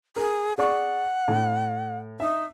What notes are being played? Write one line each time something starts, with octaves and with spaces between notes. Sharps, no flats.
G#4 A#4
G#4 D5 F#5 C#6
A2
D#4 E5